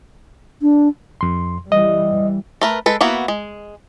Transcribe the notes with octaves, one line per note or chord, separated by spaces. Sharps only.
D4
F2 C6
E3 G3 D#5
A3 A#4 B4
G#3 A4 B4
A#3 B3 E4 F#4
G#3